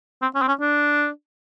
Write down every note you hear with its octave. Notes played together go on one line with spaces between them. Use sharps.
C4
C#4
C4
C#4
D4